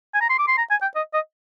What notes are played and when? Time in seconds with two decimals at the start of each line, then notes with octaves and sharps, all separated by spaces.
0.14 G#5
0.21 A#5
0.29 C6
0.39 D6
0.48 C6
0.57 A#5
0.71 G#5
0.82 G5
0.95 D#5
1.14 D#5